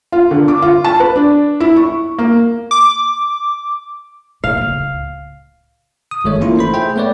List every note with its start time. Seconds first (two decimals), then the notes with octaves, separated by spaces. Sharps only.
0.12 F4
0.31 D3
0.48 D6
0.62 F4
0.84 A5
1.00 B4
1.16 D4
1.60 E4
1.76 C#6
2.19 A#3
2.71 D6
4.44 C2 A#2 F5
4.57 D1 C#2
6.11 D#6
6.24 G1 D#3 G#3 A3 C#5
6.41 E3 A3 A#3 C#4 E4 F4
6.56 A3 D#4 C5 B5
6.74 G#4 C5 E5 G5
6.96 A3 B3 B4 C#5 D5